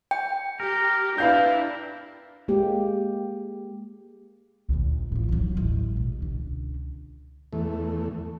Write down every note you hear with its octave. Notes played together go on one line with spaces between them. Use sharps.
G5
G4 A#4
D4 E4 B4 F5 G6
G#3 A#3 G4
D2 A#2
A2 F3
D#2 F#3
A1 G#3
B2
C#2 D3
E2 A3